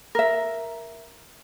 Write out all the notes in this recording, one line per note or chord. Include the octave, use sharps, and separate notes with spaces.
A#4 E5